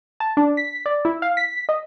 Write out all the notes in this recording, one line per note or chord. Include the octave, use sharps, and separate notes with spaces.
A5
D4
B6
D5
E4
F5
B6
D#5